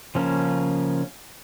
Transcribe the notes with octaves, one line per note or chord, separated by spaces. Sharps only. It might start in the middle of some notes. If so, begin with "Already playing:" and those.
C#3 F3 A#3 C#4